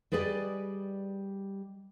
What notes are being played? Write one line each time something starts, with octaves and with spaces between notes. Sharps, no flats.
G3 G#4 B4 D5 D#5